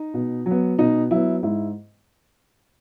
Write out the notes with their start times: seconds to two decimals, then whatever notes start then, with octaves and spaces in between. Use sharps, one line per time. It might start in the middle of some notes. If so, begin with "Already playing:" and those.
Already playing: D#4
0.14 B2
0.46 F#3 B3
0.79 B2 D#4
1.11 F#3 B3 E4
1.43 G#2 E4